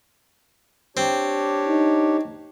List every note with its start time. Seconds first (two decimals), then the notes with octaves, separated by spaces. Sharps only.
0.97 C4 D4 G4 C#5
1.68 D#4